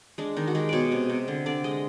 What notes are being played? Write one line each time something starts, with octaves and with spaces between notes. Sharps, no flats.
G#3 D4
D#3 D#4
F#4
G#3 G4
B2 C#5 D5
C3
C3
D3
D3 D5
G#3 D#5